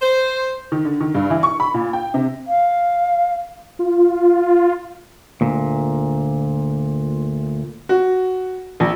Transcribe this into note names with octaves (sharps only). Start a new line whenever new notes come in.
C5
D#3
D3
D#3
G2
E3
C#6
B5
A#2
G5
C3
F5
F4
D2 A#2
F#4
A#1